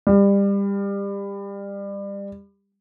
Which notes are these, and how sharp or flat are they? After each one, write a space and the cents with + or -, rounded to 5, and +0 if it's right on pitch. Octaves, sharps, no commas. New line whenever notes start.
G3 +25